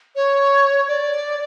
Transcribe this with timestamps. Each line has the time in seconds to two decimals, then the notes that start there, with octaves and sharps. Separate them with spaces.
0.16 C#5
0.88 D5